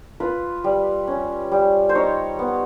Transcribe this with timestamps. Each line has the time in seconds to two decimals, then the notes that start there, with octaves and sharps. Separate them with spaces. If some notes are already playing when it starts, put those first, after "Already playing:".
0.20 F4 B4
0.64 G3
1.07 C#4
1.52 G3
1.89 C5
1.95 D#4 C#5
2.39 B3